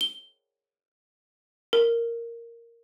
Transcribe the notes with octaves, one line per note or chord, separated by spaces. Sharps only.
G7
A#4